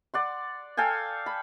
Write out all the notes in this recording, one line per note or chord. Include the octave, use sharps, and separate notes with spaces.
D5 F#5 C6
A4 F5 G5 G#5
B5